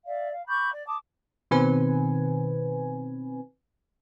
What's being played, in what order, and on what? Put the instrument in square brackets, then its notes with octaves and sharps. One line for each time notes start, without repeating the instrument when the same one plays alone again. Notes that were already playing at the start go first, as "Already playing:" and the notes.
[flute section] D5 E5 F5
F5
B5 C#6 D6 G6
D5
A5 D6 D#6
[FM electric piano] B2 D#3 C4 B4 G#5